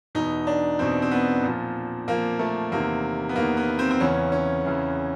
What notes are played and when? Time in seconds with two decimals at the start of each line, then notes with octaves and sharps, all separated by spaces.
0.15 E2 B2 D#4
0.47 D4
0.79 E2 B2 C4
1.02 C4
1.11 B3
1.43 A#2 F3
2.08 A#2 F3 A#3
2.39 A3
2.71 E2 C3 D#3 A#3
3.29 B3
3.36 E2 C3 D#3 A#3
3.57 B3
3.79 C4
3.91 C4
4.00 E2 C#3 E3 C#4
4.32 C#4
4.65 E2 C#3 E3